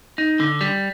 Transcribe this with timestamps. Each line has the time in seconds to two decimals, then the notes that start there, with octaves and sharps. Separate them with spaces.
0.18 D#4
0.40 D3
0.61 G3